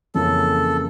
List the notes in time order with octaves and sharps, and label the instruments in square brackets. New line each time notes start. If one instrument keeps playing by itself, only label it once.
[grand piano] F2 C#3 E3 A#3 C#4 [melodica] A4